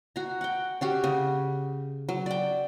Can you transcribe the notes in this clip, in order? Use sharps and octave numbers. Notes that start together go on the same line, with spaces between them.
F#4 A#5
F#5 G5
C#4 F#4 G4
C#3
F#3
D5 G5